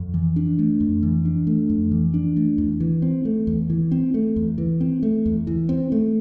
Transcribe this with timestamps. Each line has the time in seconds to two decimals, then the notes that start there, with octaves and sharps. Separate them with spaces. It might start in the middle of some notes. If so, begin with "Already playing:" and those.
Already playing: F2
0.14 E3
0.36 D4
0.59 A3
0.80 F2
1.03 E3
1.25 D4
1.47 A3
1.70 F2
1.91 E3
2.14 D4
2.36 A3
2.58 E2
2.80 E3
3.02 C4
3.25 A3
3.47 E2
3.70 E3
3.92 C4
4.14 A3
4.36 E2
4.58 E3
4.81 C4
5.03 A3
5.26 E2
5.47 E3
5.69 C4
5.92 A3